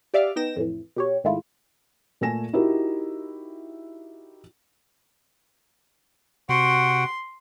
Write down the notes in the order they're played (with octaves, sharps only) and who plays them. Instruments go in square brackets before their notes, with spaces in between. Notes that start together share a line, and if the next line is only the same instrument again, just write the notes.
[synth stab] G4 D5 E5 F5 D6 F6
B3 D#4 G5 A#6 E7
F2 A2 E3
B2 G4 C#5
G#2 D#3 G#3 A3 E4 F4
[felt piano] A#2 A3 A4 G#5 A#6 E7
D#4 E4 F#4 G4 A#4
[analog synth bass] C3 [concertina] F#4 F#5 G5 [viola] C6